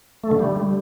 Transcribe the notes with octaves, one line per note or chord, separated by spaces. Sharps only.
A3
D3
G3